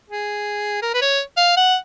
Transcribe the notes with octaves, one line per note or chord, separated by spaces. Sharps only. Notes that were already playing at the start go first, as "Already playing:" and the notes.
G#4
A#4
B4
C#5
F5
F#5